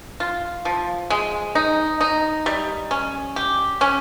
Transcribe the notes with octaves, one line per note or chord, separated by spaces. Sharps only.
F4
F3
G#3
D#4
D#4
G3
C#4
G4
C#4